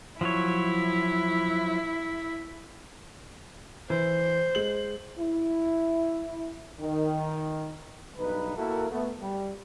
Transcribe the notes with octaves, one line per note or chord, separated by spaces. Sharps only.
F3 F#3 E4 C#5
E3 C5
G#3 F#7
E4
D#3
B1 G2 D#4 B4
A#3 E4 F#4 A4 A#4
A3 B3
G3